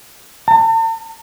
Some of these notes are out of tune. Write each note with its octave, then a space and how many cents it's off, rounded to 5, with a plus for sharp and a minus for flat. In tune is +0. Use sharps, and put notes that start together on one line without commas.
A5 +45